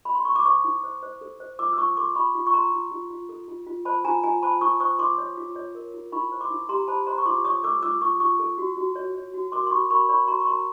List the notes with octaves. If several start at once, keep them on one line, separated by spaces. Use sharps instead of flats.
B5
C6
C#6
D6
C5 C#6 D#6
E4
C5
C5
A4
C5
F4 D6 E6
E6
F4 C#6 D#6
A4 C6 D6
F4 B5 C#6
F4
C#6
A4 A#5 C6
F4
F4
F4
A4
F4
F4
C5 A5 B5
F4 G#5 A#5
F4 G#5 A#5
C5 A5 B5
F4 C#6 D#6
C5 C#6 D#6
F4 C6 D6
C#5
F4
C#5
A#4
F4
E4 B5 C#6
C5
C6 D6
E4
G4 A#5 C6
C5 A5 B5
C5 A#5 C6
C#6
F4 C6 D6
C#5 C#6 D#6
A4 D6 E6
F4 D6 E6
F4 C#6 D#6
F4 C#6 D#6
A4
F#4
F#4
C#5
C#5
F#4
A#4 C6 D6
C6
F#4 B5 C#6
A#4 B5 C#6
C#5 B5 C#6
F#4 A#5 C6
C#6
A#4 A#5 C6